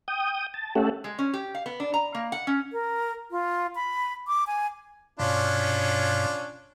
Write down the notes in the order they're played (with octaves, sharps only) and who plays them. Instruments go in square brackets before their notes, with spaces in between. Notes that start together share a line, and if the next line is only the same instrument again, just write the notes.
[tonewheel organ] G5 D#6
A5
A3 C#4 G4 A4 E5 F#5
[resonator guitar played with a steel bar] G#3
C#4
G4
F5
B3
D4
A#5
A#3
F#5
C#4
[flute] A#4
F4
B5
D6
G#5
[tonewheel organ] G2 B2 [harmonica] C#4 D4 F4